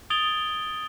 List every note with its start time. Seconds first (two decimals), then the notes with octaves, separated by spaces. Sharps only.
0.10 D#6 G#6 A6 D7 F7 G7